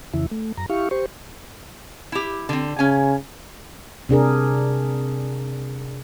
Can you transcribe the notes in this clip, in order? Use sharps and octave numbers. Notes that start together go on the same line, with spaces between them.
F2 C#3 E3 E4
A3
F#2 A#5
E4 G4 F5 C#6
G4 C5 C#6
E4 G4
D3 C4
C#3 C#4 G#5
C3 D4 G#4 A#4